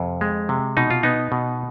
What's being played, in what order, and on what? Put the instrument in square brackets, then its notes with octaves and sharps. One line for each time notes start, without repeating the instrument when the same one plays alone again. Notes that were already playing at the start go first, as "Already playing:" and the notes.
Already playing: [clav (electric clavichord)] F2 C3
G#3
C3
B2 D#4
F4
B3 D#4
B2